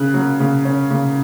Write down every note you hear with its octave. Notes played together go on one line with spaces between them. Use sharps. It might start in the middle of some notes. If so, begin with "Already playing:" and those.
Already playing: C#3 F#6
F#3
C#3
C#4
C#3